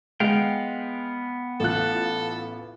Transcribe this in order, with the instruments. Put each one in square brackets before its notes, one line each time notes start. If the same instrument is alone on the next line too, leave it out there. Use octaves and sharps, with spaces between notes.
[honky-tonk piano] G#3 [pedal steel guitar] B3 F5 G5
[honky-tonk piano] A1 F4 F#6 [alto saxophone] A4